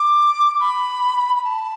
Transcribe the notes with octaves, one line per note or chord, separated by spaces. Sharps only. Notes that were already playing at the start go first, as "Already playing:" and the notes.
Already playing: D6
B5
B5
A5